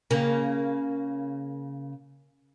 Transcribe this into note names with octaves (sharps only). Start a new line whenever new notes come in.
C#3 A#3